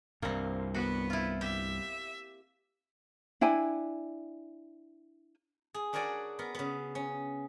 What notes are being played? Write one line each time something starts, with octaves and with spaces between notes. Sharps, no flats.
C2 G2 A#3 C4
B3 F#4
E4 F4
G4 E5
D4 E4 G5 G#5
G#4
D4 F#4 A#4 C#5 D5 G#5
B3 A#4
C#3 B3
C#4